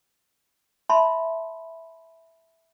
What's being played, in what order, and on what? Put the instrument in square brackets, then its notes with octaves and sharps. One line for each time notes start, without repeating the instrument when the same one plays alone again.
[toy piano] E5 A5 B5 C6